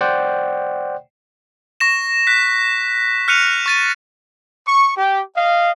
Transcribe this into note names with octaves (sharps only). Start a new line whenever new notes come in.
C5 D5 F#5 G5
C#6 A#6 E7
F#6 B6
F6 F#6 C#7 D#7 F7
C#6 A6 D#7
C#6
G4
D#5 F5